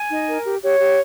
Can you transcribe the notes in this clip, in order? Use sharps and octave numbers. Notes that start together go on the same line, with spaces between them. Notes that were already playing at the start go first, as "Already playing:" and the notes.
Already playing: G#5
D#4
A#4
G4
G4 C#5
G4